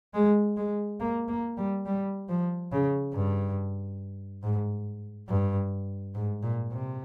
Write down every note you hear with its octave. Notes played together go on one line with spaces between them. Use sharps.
G#3
G#3
A#3
A#3
G3
G3
F3
C#3
G2
G#2
G2
G#2
A#2
C3